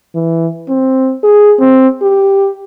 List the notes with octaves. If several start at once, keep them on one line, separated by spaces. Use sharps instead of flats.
E3
C4
G#4
C4
G4